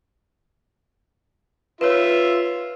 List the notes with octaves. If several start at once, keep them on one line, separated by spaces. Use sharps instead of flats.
F4 B4 C#5 E5